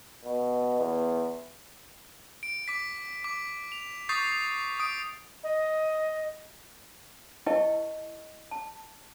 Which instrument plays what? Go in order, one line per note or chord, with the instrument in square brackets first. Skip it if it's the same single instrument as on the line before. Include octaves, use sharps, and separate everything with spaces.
[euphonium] B2
E2
[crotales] D7
D6 B6
D6
F7
C#6 D#6 G6 A6 C7
D#6 D7
[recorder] D#5
[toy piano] E4 B4 D#5 G5 A5 C#6
A5